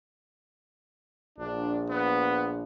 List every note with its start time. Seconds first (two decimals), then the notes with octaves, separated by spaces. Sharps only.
1.38 A#1 D4
1.90 B3